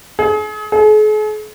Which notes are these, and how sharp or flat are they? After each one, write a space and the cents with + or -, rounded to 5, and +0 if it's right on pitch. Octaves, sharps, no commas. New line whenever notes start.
G#4 +35
G#4 +45